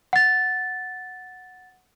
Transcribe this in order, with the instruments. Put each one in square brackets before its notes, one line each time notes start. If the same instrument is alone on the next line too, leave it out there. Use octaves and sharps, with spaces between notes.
[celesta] F#5 A6